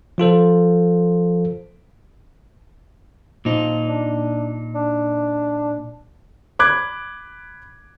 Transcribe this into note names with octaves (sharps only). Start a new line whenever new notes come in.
F3 F4 A4 C5
A#2 F3 D#4
D4
D4
B5 D6 F#6 G#6